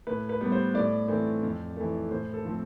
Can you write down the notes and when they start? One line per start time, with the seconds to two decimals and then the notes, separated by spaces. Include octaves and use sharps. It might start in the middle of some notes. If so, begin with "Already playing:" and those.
0.07 A2 B4
0.29 B4
0.41 G3 B3
0.52 C5
0.74 A2 D5
1.08 E3 A3 C4
1.43 F2
1.77 E3 A3
2.10 A2 C5
2.34 A4
2.45 F3 A3 C4